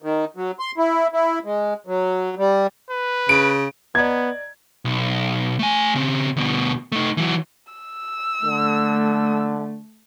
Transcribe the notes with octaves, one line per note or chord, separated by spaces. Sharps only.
D#3
F#3
C6
E4
E4
G#3
F#3
G3
B4
C#3 D7
B3 D5 D#5 A#5 G#6
B1
A3 G#5
C#3 C4
D2 B2
A3 D#4
E3 F#3
E6
D3 A3